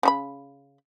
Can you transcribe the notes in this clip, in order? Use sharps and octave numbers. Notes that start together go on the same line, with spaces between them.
C#3 F#4 B5